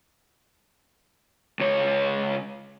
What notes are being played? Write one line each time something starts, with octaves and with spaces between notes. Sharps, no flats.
C#2 C#5